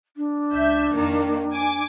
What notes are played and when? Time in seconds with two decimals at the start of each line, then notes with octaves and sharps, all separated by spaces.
0.16 D4
0.53 C#2 E5 G6
0.94 F2 D#3 A#3
1.52 G#5 D6